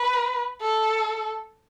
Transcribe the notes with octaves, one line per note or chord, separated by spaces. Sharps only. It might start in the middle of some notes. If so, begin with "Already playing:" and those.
Already playing: B4
A4